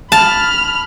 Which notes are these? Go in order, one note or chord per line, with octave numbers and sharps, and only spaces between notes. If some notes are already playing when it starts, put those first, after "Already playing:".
A5 B5 F6